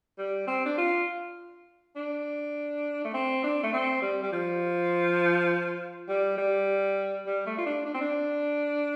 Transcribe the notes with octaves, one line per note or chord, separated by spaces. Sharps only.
G3
C4
D4
F4
D4
A3
C4
D4
A3
C4
G3
G3
F3
G3
G3
G3
A3
F4
D4
D4
C4
D4